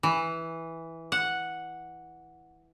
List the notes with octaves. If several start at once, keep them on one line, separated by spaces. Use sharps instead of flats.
E3
F#5